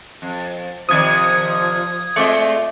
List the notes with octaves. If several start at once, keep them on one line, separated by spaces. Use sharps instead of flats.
F2
C3 D#3 F3 D5 D#6 G#6
G#3 A3 C4 F4 D5 D#5